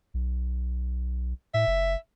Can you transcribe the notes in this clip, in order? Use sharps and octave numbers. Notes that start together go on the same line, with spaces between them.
B1
A2 E5
F#1